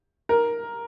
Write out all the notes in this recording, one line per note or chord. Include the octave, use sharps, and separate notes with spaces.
A#4